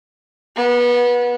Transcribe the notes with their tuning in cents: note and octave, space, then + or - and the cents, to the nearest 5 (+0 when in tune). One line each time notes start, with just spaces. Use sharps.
B3 -25